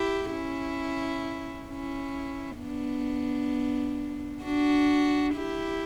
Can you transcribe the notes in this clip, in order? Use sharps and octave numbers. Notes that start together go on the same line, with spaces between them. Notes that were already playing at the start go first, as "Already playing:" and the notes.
Already playing: E4 G4
C#4 E4
C#4 E4
B3 D4
D4 F#4
E4 G4